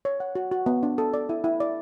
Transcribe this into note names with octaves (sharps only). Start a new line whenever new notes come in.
C#5
F#5
F#4
F#4
B3
D4
A4
D5
E4
E4
D5